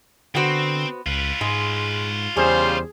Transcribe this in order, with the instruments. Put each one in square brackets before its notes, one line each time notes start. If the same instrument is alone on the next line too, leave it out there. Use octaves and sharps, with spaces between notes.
[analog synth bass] D3 [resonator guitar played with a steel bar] B3 F#4 C5 [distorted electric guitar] C4
[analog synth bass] C#2 [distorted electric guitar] F4 B4
[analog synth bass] G#2 [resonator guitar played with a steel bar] G#3
[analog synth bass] E2 [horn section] C#3 G3 C5 [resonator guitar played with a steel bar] G#4